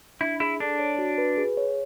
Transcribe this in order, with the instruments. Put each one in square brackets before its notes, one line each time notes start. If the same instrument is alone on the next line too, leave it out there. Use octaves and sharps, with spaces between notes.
[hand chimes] D4 [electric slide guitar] E4
[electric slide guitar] E4 [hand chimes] G#4
[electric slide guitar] D4 [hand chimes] A4
[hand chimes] C#5
F#4
B4
G#4
C#5